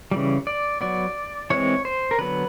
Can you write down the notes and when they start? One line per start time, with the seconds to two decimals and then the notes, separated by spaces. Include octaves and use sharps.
0.11 C#3 E3 G3
0.47 D5
0.81 F#3 B3 D5
1.50 E3 G#3 C4 C#5
1.85 C5
2.11 A#4
2.18 D3 F#3 B3 B4